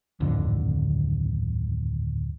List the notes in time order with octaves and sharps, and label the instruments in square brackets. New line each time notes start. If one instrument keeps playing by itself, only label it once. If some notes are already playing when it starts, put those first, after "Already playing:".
[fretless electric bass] D1 G#1 F2 D3